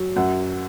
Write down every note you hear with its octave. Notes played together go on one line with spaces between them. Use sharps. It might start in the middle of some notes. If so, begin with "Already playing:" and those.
Already playing: F#3
F#2 F#5